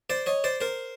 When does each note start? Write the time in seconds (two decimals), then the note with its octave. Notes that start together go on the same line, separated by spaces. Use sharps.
0.10 C5 D5
0.26 C#5 D#5
0.44 C5 D5
0.61 A#4 C5